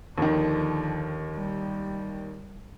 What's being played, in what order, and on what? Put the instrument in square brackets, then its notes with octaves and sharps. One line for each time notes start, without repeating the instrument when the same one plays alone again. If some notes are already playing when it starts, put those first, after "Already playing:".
[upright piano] D#2 D#3 [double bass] D3 F3
[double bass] G3